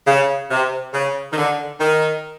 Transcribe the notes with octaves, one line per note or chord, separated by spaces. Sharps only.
C#3
C3
C#3
D#3
D3
D#3